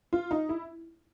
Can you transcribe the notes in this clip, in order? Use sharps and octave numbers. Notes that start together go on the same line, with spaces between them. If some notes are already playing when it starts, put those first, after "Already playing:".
F4
D#4
E4